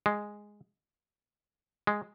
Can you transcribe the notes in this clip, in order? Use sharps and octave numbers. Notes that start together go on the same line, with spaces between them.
G#3
G#3